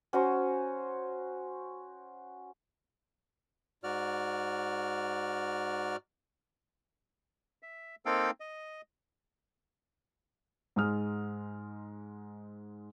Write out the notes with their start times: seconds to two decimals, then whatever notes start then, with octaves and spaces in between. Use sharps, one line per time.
0.13 C#4 F#4 C5 A#5
3.84 G#2 F#4 D5 F6
7.63 E5
8.06 A#3 C4 D#4 A4 F5 G5
8.40 D#5
10.76 G#2 G#3 D#6 F6